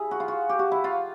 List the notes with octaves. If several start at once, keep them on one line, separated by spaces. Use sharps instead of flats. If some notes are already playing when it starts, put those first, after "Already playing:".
Already playing: E4 G#4
F#4
F4
F#4
G4
F#4
E4
F4